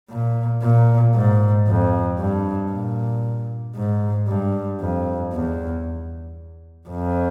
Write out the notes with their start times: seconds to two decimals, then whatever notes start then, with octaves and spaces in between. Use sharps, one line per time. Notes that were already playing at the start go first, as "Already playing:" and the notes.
0.10 A#2
0.62 A#2
1.14 G#2
1.67 F2
2.19 G2
2.72 A#2
3.76 G#2
4.28 G2
4.80 F2
5.33 E2
6.89 F2